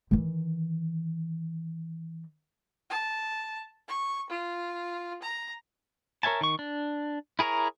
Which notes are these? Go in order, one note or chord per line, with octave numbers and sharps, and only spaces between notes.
D#3 E3
A5
C#6
F4
A#5
A#4 C#5 E5 G#5 A5
D#3 C#6
D4
E4 G#4 A#4 C#5 A#5